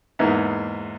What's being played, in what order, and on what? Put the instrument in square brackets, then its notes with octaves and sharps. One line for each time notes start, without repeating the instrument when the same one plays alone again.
[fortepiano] E2 G#2 A#3 B3 D#4 E4